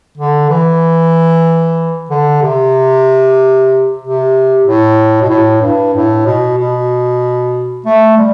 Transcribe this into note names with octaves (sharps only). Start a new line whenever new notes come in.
D3
E3
D3
C3
C3
A2
B2
A2
G2
A2
B2
B2
A3
G3